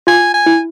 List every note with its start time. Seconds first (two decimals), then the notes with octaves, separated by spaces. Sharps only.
0.07 F4 G#5
0.34 G#5
0.46 E4